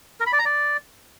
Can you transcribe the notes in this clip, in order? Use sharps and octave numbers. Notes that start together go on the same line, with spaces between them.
A#4
B5
D5
A#5
D5